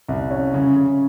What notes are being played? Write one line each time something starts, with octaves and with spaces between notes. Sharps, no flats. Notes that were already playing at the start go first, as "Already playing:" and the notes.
C2
C#4
C#3
C#3